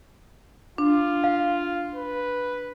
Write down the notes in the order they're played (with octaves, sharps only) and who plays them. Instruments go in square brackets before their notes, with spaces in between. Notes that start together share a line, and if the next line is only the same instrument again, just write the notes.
[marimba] D4 [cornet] F4
[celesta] F5
[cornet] B4